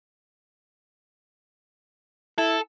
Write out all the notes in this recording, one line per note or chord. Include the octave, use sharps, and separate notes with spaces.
E4 A4